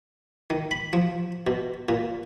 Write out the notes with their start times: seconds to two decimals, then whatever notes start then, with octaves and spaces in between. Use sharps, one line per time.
0.50 D#3
0.71 B5
0.93 F3
1.47 B2
1.89 A#2